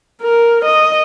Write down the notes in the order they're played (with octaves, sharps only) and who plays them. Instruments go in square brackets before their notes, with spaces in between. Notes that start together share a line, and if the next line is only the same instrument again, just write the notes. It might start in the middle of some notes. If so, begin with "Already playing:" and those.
[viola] A#4
D#5